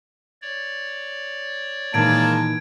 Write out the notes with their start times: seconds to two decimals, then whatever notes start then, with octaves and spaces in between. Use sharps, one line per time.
0.42 C#5 D5
1.94 A#2 D#3 E3 G#3 A#3 A5 G#6 D7